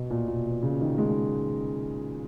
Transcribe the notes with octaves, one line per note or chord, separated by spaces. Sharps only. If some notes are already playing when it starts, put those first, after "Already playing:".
Already playing: B2
A#2
A#2
B2
C#3
D#3
G#3